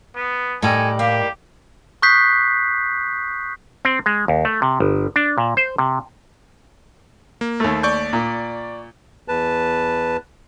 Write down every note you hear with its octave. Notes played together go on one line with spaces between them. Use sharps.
B3
A2 D#3 G3 D#4 A4 G#5
A#3 G4
C#6 D#6 F#6 G6 B6 C7
C4
G#3
D#2
A3
C3
G1
D4
A#2
C5
C3
A#3
D#2 A3
D5 C#6 G6
A#2
E2 B4 A5